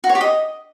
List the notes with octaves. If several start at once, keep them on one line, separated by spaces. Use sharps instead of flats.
F#4
C#5
G4
D#5